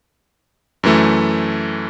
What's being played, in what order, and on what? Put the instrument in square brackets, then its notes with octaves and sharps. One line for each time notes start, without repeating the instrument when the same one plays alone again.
[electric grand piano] F#2 E3 A3